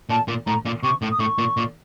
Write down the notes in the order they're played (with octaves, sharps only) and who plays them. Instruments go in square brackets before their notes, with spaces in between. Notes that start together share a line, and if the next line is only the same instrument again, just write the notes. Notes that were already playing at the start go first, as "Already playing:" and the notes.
[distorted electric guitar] A#2 [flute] A5
[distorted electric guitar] A#2
[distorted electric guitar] A2 [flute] A#5
[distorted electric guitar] A#2
[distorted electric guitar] C3 [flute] C#6
[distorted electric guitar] A2
[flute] D#6
[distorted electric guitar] A2 [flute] C#6
[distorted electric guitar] A#2
A#2